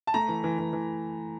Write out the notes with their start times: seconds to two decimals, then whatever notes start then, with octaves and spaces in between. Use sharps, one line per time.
0.07 A5
0.14 A3 A#5
0.28 E3
0.44 E3
0.59 E3
0.73 E3